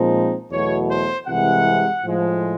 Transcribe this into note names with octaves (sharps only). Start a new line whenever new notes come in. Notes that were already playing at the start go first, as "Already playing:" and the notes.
Already playing: A#2 F3 G#3 C4 D#4
E2 B2 F#3 A3 C#5
C5
C2 C3 E3 G#3 F#5
A2 F3 G#3